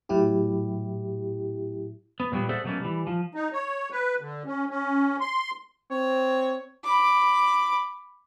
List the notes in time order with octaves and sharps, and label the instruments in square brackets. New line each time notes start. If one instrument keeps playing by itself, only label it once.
[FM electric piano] A2 F#3 E4 G4
[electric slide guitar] B3
A#2 F#3 G3 B3
G#4 A4 C5 D5 E5 F#5
B2 F#3 A3 A#3 C#4
E3 G3
F3
[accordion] D#4
C#5
B4
D3
C#4
C#4
C6
[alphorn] C4 [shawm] C#5
[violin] B5 D6